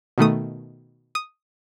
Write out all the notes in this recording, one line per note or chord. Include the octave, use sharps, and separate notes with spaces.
B2 D#3 A3 D#6
D#6